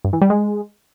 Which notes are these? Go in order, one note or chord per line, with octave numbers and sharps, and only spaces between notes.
G2
E3
G3
G#3